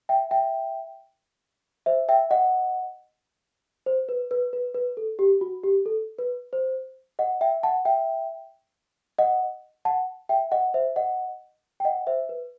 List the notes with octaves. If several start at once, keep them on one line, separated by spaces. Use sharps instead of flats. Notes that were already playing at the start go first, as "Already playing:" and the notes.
E5 G5
E5 G5
C5 E5
E5 G5
D#5 F#5
C5
B4
B4
B4
B4
A4
G4
F#4
G4
A4
B4
C5
D#5 F#5
E5 G5
F#5 A5
E5 G5
D#5 F#5
F#5 A5
E5 G5
D#5 F#5
C5 E5
D#5 F#5
G5
D#5 F#5
C5 E5
B4